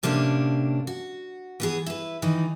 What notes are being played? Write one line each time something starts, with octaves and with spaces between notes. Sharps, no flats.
A2 C3 A#3 C#4 D4
F#4
E3 B3 G#4
E4 B4
D#3 E3 D#4